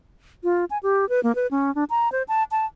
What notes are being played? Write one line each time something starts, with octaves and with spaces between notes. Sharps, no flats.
F4
G#5
G4
B4
A#3
B4
C#4
D4
A#5
C5
A5
A5